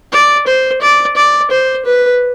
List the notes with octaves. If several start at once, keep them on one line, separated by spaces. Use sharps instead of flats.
D5
C5
D5
D5
C5
B4